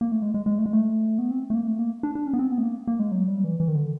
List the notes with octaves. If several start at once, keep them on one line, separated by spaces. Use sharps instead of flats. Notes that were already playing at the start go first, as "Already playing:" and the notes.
A#3
A3
G#3
G#3
G#3
A3
G#3
A3
B3
C4
A3
A#3
A3
A#3
D4
D4
C#4
B3
C4
B3
A3
A#3
A#3
G#3
F#3
G3
E3
E3
D#3
D3